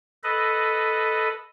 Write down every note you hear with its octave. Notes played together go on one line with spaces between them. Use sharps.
A4 B4 D#5